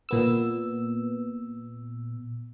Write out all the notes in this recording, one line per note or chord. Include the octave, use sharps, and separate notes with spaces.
A#2 B3 E6